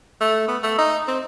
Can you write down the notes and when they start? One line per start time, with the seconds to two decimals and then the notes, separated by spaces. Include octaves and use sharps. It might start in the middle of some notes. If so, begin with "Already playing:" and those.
0.21 A3
0.48 B3
0.63 A3
0.78 D#4
1.08 C4